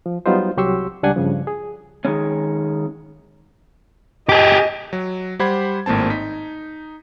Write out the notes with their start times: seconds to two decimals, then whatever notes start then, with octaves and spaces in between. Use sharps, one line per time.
0.06 F3
0.26 F#3 G3 B3 D#4 F4 C5
0.57 C2 F#3 G4 C6 C#6 E6
1.03 C#2 G3 D4 F#5 G#5 G#6
1.16 G2 C#3 F3
1.47 G#4
2.05 D#3 G#3 C#4
4.29 G4 G#4 D#5
4.93 F#3
5.39 G3 G4 C5 F#5 B5 G#6
5.86 G#1 A2 A#3 C4 A5
6.10 D#4 B6